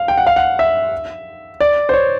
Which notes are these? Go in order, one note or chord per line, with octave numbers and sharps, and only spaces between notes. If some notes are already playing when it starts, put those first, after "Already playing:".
Already playing: F5
G5
F#5
F5
F#5
E5
D5
C5
C#5